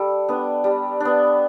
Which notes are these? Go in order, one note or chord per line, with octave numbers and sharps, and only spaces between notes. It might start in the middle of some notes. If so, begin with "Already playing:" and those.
Already playing: G3 A4
B3 D4
G3
B3 D4